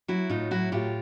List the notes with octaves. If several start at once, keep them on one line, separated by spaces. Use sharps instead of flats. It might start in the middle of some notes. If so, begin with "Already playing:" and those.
F#3 E4 F#4
A2 D#4 F4
F#3 E4 F#4
A2 F4 G4